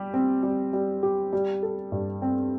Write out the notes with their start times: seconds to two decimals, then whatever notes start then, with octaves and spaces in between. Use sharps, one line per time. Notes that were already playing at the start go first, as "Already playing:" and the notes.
Already playing: G3 G4
0.14 C4
0.43 G3
0.73 G3
1.03 G4
1.33 G3
1.63 A4
1.92 G2
2.22 C4